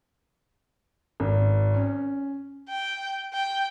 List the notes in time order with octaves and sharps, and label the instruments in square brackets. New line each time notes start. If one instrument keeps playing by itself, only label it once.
[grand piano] G#1
C#4
[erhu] G5
G5